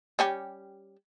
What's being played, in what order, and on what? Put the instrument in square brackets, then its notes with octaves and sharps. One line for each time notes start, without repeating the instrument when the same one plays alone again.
[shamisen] G3 C#4 G4